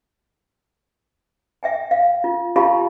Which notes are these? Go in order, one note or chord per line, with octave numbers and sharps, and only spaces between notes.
E5 G5 G#5
F5
F4
F4 G4 F5 A5 B5